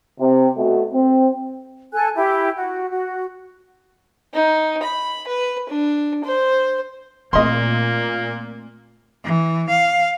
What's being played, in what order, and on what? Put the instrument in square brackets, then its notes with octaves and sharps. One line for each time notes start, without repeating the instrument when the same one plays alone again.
[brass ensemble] C3
B2 A3 F#4
C4
[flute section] A4 G#5 F#6
E4 G4
F#4
F#4
[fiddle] D#4
B5
B4
D4
C5
[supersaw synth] A#2 [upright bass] A3 C4 [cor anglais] A#3 [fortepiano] D#5 C6
[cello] E3
F5